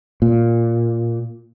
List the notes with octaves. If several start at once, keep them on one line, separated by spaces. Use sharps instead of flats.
A#2